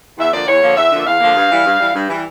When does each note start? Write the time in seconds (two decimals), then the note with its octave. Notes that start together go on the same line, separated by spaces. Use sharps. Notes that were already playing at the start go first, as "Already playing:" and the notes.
0.18 E2 E5
0.32 D3 F3 A#3 D5
0.47 E2 C#5
0.63 D3 F3 A#3
0.77 E2 E5
0.91 D3 F3 A#3
1.06 E2 F5
1.20 D3 F3 A#3
1.35 G2
1.50 E3 G3
1.65 G2
1.80 E3 G3
1.94 G2
2.09 E3 G3